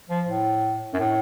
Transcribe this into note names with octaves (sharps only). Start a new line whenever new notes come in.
F3
A2
F#2
A2